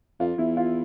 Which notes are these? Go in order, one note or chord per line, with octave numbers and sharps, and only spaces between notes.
F2 F4
E2 E4
F4